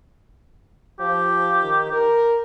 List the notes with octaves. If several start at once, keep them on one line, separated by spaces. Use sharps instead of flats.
F3 G4
D#3
A#4